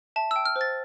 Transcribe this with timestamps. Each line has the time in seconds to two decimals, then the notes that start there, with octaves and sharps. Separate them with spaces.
0.16 E5 A5
0.31 G5 E6
0.45 F6
0.56 C5
0.61 A6